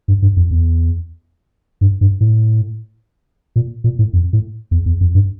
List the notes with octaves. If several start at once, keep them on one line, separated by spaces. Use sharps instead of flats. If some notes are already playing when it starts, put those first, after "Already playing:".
G2
G2
F2
E2
G2
G2
A2
A#2
A#2
A2
F2
A2
E2
E2
F2
G2